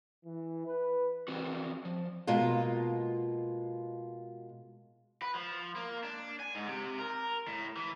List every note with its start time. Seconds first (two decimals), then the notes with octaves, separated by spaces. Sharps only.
0.25 E3
0.66 B4
1.28 E3 C4 F#4
1.85 F3
2.27 B2 G#3 A#3 F4
5.22 B4
5.35 F3
5.76 A#3
6.04 D4
6.40 G#5
6.55 G#2
6.67 C3
6.99 A#4
7.48 A2
7.76 E3